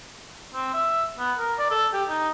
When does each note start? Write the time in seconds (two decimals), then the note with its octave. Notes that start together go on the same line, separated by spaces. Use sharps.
0.54 C4
0.73 E5
1.18 B3
1.38 A#4
1.59 D5
1.71 A4
1.93 G4
2.09 D#4